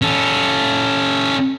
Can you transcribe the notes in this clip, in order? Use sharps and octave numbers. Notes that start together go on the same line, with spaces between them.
C#4 A4